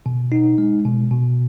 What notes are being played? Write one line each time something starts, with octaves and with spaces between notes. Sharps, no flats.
B2
D#4
G#3
B2
B2